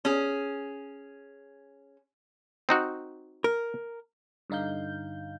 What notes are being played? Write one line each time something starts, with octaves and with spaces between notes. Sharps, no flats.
C#4 G#4
C4 D#4 F#4
A#4
G2 D3 D#4 F5 G6